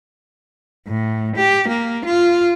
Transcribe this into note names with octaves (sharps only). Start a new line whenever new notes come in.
A2
G4
A#3
F4